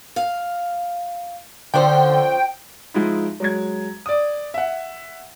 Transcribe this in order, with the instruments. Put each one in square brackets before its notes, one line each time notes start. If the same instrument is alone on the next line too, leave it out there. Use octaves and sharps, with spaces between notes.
[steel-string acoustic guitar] F5
[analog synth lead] D3 [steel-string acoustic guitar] F3 C#4 C5 [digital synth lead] G5
[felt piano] F3 G#3 D#4 E4
F#3 G#3 G#6
D5 D#6
E5 F#5